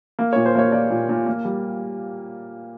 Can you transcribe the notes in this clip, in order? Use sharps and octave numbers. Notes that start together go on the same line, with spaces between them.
A#3
C#5
A#2
C5
A#3 C#5
A#3 D5
A#2
A#2
A#3
G3